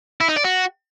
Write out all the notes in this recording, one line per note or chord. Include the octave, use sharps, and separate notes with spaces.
E4
D#4
D5
F#4